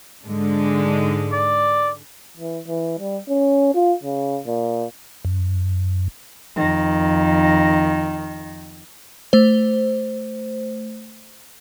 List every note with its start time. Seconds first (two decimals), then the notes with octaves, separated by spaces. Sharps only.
0.23 G#2 D3 G#3
1.32 D5
2.37 E3
2.68 E3
2.99 G3
3.29 C#4
3.74 F4
4.03 C#3
4.47 A#2
5.25 F#2
6.56 F2 D#3
9.33 A3 C5